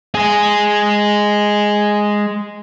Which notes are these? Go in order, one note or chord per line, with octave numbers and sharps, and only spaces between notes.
G#3 G#4